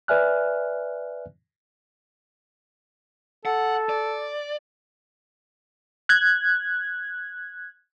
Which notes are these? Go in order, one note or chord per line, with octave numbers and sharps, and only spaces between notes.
B4 D5 E5 G#5 F6 F#6
A4 F#5
D5
F#6 G#6